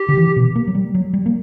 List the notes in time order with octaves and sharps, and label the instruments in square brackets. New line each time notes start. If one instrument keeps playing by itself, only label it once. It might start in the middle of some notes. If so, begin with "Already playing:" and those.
Already playing: [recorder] G4
[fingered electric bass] D3
E3
B2
A#3
F#3
G3
F#3
G3
A#3